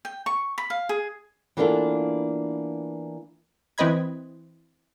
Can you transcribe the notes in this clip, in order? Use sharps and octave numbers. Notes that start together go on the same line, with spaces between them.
G5
C#6
B5
F5
G#4
E3 A#3 B3 D4 F4 A4
E3 C4 B4 D#5 B5 G#6